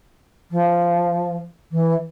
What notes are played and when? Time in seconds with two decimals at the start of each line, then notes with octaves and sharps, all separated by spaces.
0.51 F3
1.71 E3